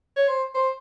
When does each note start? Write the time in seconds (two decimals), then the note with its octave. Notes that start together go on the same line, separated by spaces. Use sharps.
0.16 C#5
0.28 C5
0.54 C5